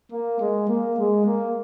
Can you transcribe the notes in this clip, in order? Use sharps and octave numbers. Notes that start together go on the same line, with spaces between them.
A#3
G#3
A#3
G#3
A#3